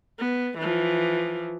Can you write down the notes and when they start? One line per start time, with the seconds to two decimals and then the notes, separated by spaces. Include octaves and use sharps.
0.18 B3
0.58 E3 F3